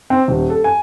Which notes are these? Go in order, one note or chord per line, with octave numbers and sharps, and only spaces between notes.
C4
D#1
A4
G#5